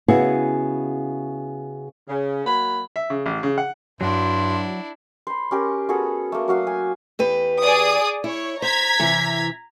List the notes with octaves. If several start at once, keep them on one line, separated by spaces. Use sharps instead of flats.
C#3 B3 E4 F#4 G#4
C#3
F#3 A#3 B5
E5
C#3
A1
C#3
F#5
G2 F#3 D4 E4 F#4 C6
C5 B5
C#4 G4 A#4 C6
B3 F#4 G#4 A4
A3 A#3
F#3 F#4 F5 D#6
G#5
E2 G4 B4
G#4 D5 D#6
E4 C#5
C5 A#5 G#6 B6
C3 E3 E4